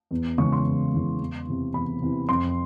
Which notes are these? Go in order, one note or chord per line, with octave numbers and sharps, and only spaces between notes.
E2
C#3 E3 G#3 C#6
C6
E2
C#3 E3 G#3
E2
C3 E3
E2 B5
C3 E3
F2 C6